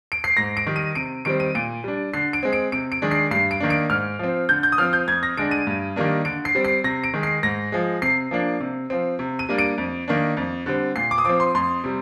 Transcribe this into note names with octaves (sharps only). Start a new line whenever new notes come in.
D7
C7
G#2 A#6
D7
D#3 G3
D#7
C3 D7
D#3 G3 C4 D7
D#7
A#2 D7
G3 D4
D3 C7
D7
G#3 C4
D7
C3 D7
D7
D#3 G#3 D4
C7
G2 C7
D7
D#3 A#3 D4
D7
G#2 F6
F3 C4
D3 G6
G6
D#6
F3 C4 F6
G6
F2 G#6
A#6
D3 G#3 D4 D7
D#7
G2
D#3 G3 A#3 D4
D3 D7
C7
G3 C4
C7
C3 A#6
D7
D#3 G#3
C7
G#2 A#6
F3 G#3
C3 C7
F3 A#3 D4
C3
F3 C4
C3
D#7
G3 A#3 D4
D7
F2
D#3 A#3 D4
F2
D3 G3 C4
A#2 C7
D6
D#6
F3 C4 D6
C6
F2 C6
C3 G3